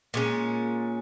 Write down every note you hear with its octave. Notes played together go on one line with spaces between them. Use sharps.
A#2 G#3 C#4